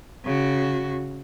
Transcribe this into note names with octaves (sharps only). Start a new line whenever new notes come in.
C#3 F#4